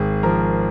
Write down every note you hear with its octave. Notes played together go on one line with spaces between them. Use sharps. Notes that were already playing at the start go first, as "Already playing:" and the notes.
Already playing: G#1 G#4
F3 A#4